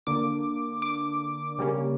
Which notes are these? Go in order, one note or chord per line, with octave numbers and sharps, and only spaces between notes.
D3 A#3 D4 D6
D6
C#3 G3 A#3 C#4